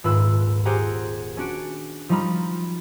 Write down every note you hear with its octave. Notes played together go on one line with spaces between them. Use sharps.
D#1 G#2 F4 B4 E6
G4 G#4 C5 F#5 G#5 A#5
C#4 D4 F#4 D7
F3 G3 D#4 A#5 B5 F6